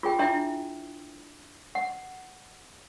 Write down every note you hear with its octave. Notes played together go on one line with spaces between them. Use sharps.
F4 G#4 G5
D4 E4 E5 G5
F#5